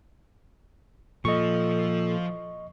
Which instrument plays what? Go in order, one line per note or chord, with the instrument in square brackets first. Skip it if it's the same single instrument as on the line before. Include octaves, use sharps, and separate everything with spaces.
[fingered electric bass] A#2 [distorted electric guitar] F3 [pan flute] A4 [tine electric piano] D#5 C#6